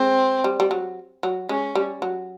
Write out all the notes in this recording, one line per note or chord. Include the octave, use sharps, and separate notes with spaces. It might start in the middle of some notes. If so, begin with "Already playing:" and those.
Already playing: G#3 C4
G3
G3
F#3
F#3
G#3 C#4
G3
F#3